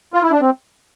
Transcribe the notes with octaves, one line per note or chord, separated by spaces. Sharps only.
F4
E4
D4
C4